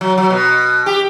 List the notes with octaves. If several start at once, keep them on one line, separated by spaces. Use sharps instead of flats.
F#3
F#3
B2
G4